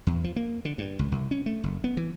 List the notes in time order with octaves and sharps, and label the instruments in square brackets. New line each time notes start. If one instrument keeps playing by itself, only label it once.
[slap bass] E2
F3
A#3
D3
G2
C#2
C2
C#4
A3
F#1
B3
E3